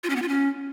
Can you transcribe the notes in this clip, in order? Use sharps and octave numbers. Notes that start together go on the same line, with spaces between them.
F4
C#4
B3
F4
C#4